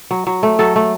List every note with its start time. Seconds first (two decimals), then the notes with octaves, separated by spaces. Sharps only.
0.11 F#3
0.27 F#3
0.43 A3
0.59 F#3 A4
0.76 A3